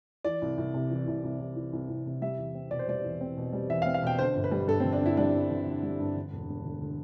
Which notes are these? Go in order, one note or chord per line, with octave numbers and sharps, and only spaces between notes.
E3 D5
C2
C2
C3
E3
C2
C2
C3
E3
C2
C2
C3
G3 E5
E2
C4
B2 D5
C5
G3 D5
E2
C4
B2
G3
E2 E5
F5
C4
F5
B2 G5
D3 C5
G1
B4
G3
G2 A4
C4
D3
D4
G1 E4
G3 D4
G2
D3
G1
G3
G2
D3
E1
E1
D2
D3